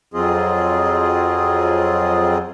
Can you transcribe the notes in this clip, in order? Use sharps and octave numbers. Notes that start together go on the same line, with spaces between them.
F2 F#3 C4 F4 G#4 D#5